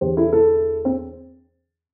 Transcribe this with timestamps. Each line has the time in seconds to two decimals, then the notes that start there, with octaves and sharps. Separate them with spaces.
0.01 E2 D3 G4 C5
0.17 E4 A4
0.32 E4 A4
0.85 C4